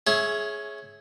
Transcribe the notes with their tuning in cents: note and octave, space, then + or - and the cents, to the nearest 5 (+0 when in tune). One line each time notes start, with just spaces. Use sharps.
C#4 -5 G#4 +15 E5 -5